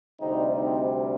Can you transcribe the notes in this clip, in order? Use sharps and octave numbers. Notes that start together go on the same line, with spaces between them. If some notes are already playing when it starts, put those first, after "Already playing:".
D2 C3 G3 C4 D#4
C4 D#4